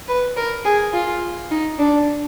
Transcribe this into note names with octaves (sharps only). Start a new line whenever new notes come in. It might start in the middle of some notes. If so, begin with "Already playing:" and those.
B4
A#4
G#4
F4
D#4
D4